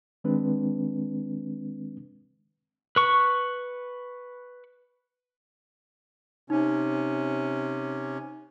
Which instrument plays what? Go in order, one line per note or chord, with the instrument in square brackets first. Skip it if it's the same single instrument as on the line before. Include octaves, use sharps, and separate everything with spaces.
[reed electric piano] D#3 G#3 C4 D4 B4
[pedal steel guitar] B4 C#6
[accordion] C3 C#4 [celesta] D#4